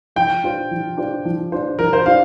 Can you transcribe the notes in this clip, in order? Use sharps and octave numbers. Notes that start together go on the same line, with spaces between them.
F3 G5
D4 F4 C5
F3
D4 F4 C5
F3
D4 F4 C5
F3 A#4
C5
D4 F4 C5 F5